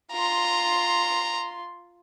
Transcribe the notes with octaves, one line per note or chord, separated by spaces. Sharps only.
F4 A#5 C6